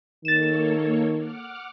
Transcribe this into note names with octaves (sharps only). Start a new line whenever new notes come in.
D#3 A#3 A4 C#5 A6 E7
F#5 D6 F6